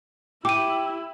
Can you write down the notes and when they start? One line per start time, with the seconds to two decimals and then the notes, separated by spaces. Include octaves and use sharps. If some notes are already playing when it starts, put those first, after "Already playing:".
0.45 E4 G4 G5 D6 D#7